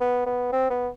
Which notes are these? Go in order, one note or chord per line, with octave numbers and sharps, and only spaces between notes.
B3
B3
C4
B3